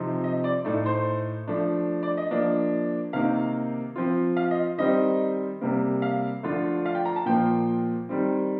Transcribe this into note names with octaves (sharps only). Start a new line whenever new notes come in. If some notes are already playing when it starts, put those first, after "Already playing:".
Already playing: C3 F3 C4 D#4
D#5
D5
A2 A3 D#4 D5
C5
F3 A3 D4
D5
D#5
F3 A#3 D4
C3 D#3 A#3 D#4 F5
F3 C4 F4
F5
D#5
D#3 G3 C4 D#4 D#5
C3 G3 A#3
F5
D3 F3 A3 D4 F4
F5
G5
A#5
A5
A#2 F3 A#3 G5
D#3 G3 C4